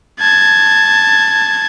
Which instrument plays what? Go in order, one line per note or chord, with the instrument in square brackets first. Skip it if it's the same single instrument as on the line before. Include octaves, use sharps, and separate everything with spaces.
[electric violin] A5 G#6